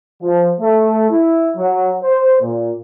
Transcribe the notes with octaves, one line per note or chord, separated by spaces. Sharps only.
F3
A3
E4
F#3
C5
A#2